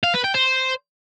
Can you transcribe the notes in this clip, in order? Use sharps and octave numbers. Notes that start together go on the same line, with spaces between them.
F5
B4
G5
C5